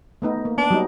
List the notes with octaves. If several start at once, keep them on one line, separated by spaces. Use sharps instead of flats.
A3 B3 D#4
A#3
B3 D4
F#3 G3 D#4